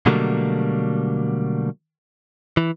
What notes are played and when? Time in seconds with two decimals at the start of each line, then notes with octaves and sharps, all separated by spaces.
0.06 B2 D3 F#3 G3 A3 A#3
2.57 E3